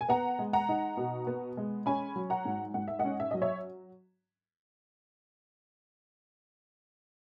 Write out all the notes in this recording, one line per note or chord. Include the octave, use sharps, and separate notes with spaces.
G#5
B3 F#5 A#5
G#3
F#5 A#5
D#4
B2
B3
G#3
C#4 G#5 B5
F#3
F#5 A#5
G#2
G#2 F#5
E5
D#5 F#5
C#4
E5
F#3 D#5
C#5 E5